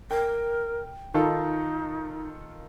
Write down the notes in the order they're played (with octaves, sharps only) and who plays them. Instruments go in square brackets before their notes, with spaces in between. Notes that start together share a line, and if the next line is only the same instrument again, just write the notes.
[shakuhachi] A#4 [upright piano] G5
[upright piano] D#3 F4 A4 [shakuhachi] D#4